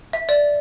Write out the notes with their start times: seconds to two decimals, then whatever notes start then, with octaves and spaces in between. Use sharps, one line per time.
0.13 E5
0.29 D5